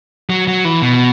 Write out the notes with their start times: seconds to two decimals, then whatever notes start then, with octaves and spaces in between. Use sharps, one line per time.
0.30 F#3
0.48 F#3
0.65 E3
0.82 B2